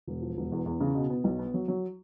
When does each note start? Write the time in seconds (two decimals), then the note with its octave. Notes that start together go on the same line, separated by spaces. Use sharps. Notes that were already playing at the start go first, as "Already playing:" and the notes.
0.07 E1
0.22 F3
0.37 E1
0.52 E2
0.66 E2
0.81 C#3
0.95 B2
1.10 B3
1.24 B1
1.39 B3
1.54 F#3
1.68 F#3